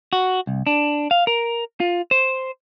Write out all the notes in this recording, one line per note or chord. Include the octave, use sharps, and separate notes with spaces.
F#4
C2
D4
F5
A#4
F4
C5